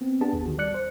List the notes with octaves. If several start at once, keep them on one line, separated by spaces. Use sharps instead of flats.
B3 C4
B3 D4 G4 G#4 A5
G1 D#2
D#3 F#4
G3 D5 F#6 C#7
C5